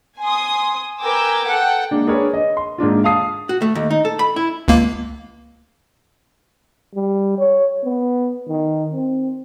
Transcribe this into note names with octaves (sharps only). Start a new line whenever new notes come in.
G#5 C6 D#6
A#4 B4 G5 G#5 D6 E6
A4 F#5 G5
G#3 A#3 D4
D4 G#4 A#4 B4 C#5 D5
D#5
C6
G#2 A#3 D4 F4
F5 A5 D#6 C7
F#4
A3
D#2
D#4
A4
B5
E4
C#2 A#3
G3
C#5
B3
D#3
C4